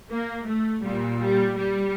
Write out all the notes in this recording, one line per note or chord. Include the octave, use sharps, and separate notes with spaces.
A#3
A3
A#2 G3
G3
G3